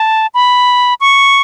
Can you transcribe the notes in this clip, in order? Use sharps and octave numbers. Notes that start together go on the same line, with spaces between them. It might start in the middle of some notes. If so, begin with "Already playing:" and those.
Already playing: A5
B5
C#6